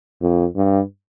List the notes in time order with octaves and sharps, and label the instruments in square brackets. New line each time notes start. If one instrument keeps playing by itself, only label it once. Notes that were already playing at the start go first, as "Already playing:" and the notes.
[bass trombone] F2
G2